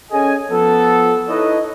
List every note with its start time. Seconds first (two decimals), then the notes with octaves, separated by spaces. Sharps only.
0.12 C#4 G#4 A4 D#5 G#5
0.51 F3 B3 A4
1.29 D#4 E4 A4 B4 C#5 D#5